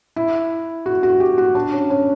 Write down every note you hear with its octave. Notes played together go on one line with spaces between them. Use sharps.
E4
F#4
F#4
G4
F#4
D4
C#4
C#4